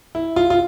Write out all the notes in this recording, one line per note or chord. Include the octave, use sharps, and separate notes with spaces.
E4
F4
F4